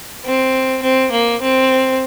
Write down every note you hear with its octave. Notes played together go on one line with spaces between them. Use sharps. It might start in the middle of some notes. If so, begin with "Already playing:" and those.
C4
C4
A#3
C4